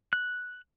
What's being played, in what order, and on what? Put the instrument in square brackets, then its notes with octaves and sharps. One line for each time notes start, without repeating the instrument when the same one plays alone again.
[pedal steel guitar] F#6